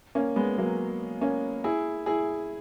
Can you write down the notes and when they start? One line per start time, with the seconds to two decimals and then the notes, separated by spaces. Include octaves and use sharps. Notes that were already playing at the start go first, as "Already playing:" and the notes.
0.15 A#3 C#4
0.36 G#3 B3
0.58 F#3 A#3
1.21 A#3 C#4
1.64 E4 G#4
2.06 E4 G#4